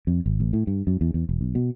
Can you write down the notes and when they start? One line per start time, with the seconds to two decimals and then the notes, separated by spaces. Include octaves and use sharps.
0.07 F2
0.26 G#1
0.40 A1
0.53 A2
0.67 G2
0.87 F#2
1.01 E2
1.14 E2
1.29 E1
1.41 B1
1.55 B2